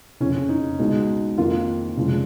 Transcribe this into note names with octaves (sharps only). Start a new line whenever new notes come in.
F#1 F2 C#3 C#4
D#4
C#2 B2 G#3 D#4
F2 D#3 A#3 F4
F1 F2 C#3 F3 G#3